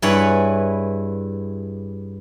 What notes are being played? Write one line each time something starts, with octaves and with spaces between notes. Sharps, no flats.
G2 E4 G#4 B4 C#5 F#5